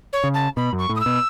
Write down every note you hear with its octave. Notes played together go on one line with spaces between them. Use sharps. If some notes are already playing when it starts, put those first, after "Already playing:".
C#5
C#3
A5
B2 B5
F#2
C#6
A2
D#6
E6
B2